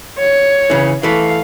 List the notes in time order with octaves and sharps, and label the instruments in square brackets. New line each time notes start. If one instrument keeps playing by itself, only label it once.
[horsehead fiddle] C#5
[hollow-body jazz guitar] C#3 E3
[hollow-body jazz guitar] E3 A3 [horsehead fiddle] F5